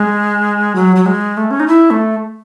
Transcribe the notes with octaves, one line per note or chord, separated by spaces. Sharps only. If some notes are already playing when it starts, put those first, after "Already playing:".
Already playing: G#3
F#3
F#3
G#3
A3
C#4
D#4
E4
A3